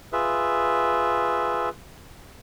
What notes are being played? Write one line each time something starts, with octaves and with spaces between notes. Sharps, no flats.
F4 G#4 B4 E5